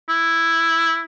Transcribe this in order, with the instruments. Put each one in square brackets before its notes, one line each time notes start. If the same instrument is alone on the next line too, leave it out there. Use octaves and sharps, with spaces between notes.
[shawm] E4